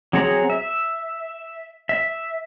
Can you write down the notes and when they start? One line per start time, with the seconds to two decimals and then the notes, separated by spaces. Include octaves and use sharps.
0.13 F#3 C4 G#4 F#5 A#5
0.50 E5
1.89 E5